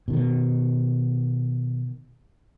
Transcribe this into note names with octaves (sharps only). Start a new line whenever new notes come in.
B2 D#3